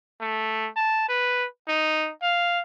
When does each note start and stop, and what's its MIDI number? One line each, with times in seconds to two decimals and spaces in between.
0.21 0.68 57
0.76 1.08 81
1.09 1.46 71
1.68 2.11 63
2.23 2.61 77